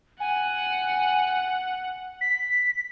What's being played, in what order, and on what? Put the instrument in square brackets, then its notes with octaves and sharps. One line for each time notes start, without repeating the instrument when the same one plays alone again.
[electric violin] F#5 [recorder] G#5
[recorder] B6